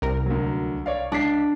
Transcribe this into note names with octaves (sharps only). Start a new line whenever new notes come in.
C2 A#4
D2 F#3
C#5 D5 F5
C#2 D4 B6 C7